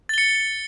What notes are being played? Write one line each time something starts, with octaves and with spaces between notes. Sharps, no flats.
A6 C#7 G7